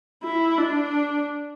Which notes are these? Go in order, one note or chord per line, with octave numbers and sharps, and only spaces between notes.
E4
D4